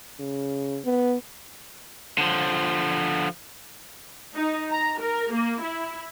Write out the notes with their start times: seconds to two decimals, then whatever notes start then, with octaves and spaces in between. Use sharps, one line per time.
0.19 C#3
0.85 B3
2.18 D3 F3
4.34 D#4
4.71 A#5
5.00 A#4
5.33 A#3
5.61 E4